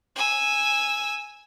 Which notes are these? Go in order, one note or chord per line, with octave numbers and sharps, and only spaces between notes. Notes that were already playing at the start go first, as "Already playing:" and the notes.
G#5 E6